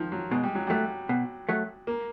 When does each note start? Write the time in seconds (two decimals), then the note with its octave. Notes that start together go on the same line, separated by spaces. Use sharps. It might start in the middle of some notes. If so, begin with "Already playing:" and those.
Already playing: D#3 F3
0.12 F#3
0.31 B2 G#3
0.43 G3
0.55 F#3
0.67 F#3 G3 A3
1.09 B2
1.49 F#3 A3
1.87 A#3